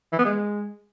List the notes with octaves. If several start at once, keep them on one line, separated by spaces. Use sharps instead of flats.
E3
B3
G#3